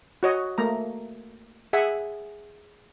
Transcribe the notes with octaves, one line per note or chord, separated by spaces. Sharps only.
F#4 C#5 D#5
A3 A#3 A#5
G#4 E5 F#5 G#5